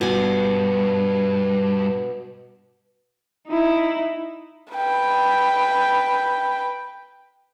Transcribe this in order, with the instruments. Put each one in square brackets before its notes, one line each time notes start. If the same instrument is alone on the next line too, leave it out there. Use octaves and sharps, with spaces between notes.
[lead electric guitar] G2 [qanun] B2 G#5
[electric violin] D#4 E4
[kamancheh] B4 G5